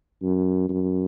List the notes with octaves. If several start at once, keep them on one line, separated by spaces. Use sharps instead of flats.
F#2
F#2